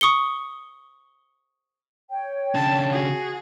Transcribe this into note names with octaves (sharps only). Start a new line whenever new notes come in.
C#6 D#6 C#7 G7
C#5 G5
C#3 D4 A5
F#4 G#4